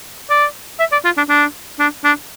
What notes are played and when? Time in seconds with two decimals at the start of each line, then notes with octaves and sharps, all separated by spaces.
0.30 D5
0.80 E5
0.92 D5
1.05 F4
1.17 D4
1.29 D4
1.80 D4
2.04 D4